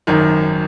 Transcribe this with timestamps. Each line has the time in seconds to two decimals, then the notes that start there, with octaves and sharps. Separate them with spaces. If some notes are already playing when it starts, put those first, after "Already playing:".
0.07 G#1 F#2 D#3